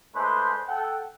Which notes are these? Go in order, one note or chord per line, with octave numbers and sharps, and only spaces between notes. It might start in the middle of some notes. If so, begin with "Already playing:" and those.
G#3 A3 D4 B4 C5
A4 F#5 G5